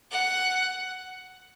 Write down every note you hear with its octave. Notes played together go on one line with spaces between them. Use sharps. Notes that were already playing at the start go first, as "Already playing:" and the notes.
F#5